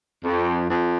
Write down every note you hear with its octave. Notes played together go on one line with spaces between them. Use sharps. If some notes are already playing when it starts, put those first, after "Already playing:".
F2
F2